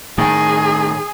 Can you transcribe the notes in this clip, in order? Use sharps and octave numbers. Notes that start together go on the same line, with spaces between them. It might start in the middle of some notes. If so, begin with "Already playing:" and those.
A2 D#3 G#4